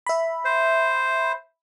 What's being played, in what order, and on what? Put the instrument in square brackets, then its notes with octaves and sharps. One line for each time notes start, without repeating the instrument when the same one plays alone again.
[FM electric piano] E5 B5
[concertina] C5